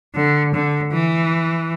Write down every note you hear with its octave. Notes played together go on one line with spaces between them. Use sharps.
D3
D3
E3